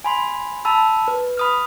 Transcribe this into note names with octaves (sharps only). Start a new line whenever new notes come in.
G#5 B5 C6
A5 B5 E6
B4
B5 D#6 F6